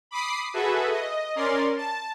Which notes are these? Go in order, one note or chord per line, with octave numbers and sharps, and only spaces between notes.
B5 D6 D#6 C7
F#4 G#4 A4 B4 E5
D#5
C#4 A#4 D5 C6
A5